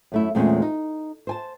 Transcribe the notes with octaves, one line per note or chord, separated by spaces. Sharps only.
F#2 A3 E4
E2 A#2 G#3 A3 C4 C#4
D#4
C5 G#5 A5